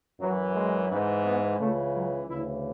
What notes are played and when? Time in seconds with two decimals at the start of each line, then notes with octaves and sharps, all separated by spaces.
0.19 F#2 E3 F#3
0.54 G#3
0.89 G#2 E3
1.23 B3
1.58 C#2 C#3 E3 A3
1.93 F#3
2.26 D2 C#3 E3 E4